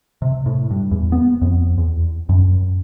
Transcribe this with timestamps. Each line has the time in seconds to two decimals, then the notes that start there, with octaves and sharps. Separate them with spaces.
0.22 C3
0.46 A2
0.71 G2
0.91 E2
1.12 B3
1.41 F2
1.78 E2
2.29 F#2